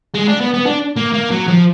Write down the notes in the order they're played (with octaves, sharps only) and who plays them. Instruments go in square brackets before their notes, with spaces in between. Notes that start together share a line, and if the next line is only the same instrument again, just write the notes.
[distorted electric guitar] G#3
D4
B3
B3
D4
A#3
A#3
F#3
F3